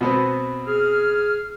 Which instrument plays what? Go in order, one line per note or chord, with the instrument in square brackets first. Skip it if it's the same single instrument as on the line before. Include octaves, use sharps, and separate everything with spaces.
[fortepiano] B2 B3 C4
[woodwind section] G#4 F6